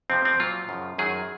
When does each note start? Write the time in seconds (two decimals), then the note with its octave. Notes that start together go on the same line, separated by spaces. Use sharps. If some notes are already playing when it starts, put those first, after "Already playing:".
0.10 F2 C3 F3 C4
0.25 C4
0.40 A#2 F#3 F4
0.69 F#2 C#3 F3
0.98 F#2 D#3 F#3 G#4